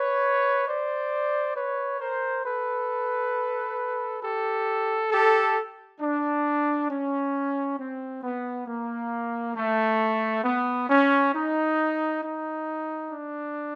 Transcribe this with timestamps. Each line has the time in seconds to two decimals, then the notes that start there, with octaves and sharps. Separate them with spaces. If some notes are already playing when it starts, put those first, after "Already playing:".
Already playing: B4 C#5
0.67 C5 D5
1.56 B4 C#5
2.00 A#4 C5
2.45 A4 B4
4.22 G4 A4
5.11 G4 A4
6.00 D4
6.89 C#4
7.78 C4
8.22 B3
8.67 A#3
9.55 A3
10.44 B3
10.89 C#4
11.34 D#4
12.22 D#4
13.10 D4